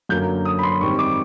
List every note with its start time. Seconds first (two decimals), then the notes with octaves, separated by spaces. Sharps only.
0.09 F#2 D3 F#3 A#3 G6
0.45 D#6
0.59 B5
0.63 C6
0.81 G#2 D#3 G3 C4 C#6
0.99 D6